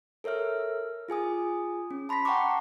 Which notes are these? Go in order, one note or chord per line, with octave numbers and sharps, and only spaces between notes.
A4 A#4 C#5 E5 F6
F4 G#4 G#5 D#6
C#4
A5 B5 C6 A#6 B6
F#5 G5 A5 A#5 C#6 D6